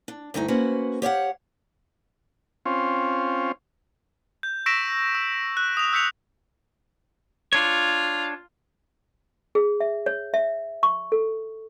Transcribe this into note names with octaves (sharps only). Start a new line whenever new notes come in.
D4
D2 G2 D#4 E4
A#3 C#4 F#4 B4 C5
G4 C#5 F5 F#5
C4 C#4 F4
G6
C#6 E6 A#6 B6 D7 E7
E6
F#6
D#6 F7
E6 G6 B6 C#7 F7
D4 F4 C#5
G#4
E5
C#5
E5
C#6
A4